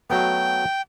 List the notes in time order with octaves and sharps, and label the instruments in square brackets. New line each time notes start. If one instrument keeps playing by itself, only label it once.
[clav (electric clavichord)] F#3 A3 B3 [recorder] G5